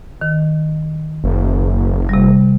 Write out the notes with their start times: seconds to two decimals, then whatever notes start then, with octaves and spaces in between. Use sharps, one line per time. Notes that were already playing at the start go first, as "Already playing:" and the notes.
0.21 D#3
1.24 F#1
2.09 C3 G3